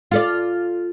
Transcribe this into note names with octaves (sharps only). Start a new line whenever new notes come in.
F4 A4 D5